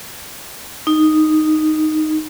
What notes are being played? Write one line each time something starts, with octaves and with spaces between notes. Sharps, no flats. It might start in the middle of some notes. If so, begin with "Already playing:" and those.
D#4